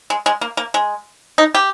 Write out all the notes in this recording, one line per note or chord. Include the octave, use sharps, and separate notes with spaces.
G#3
G#3
A#3
A#3
G#3
D#4
G4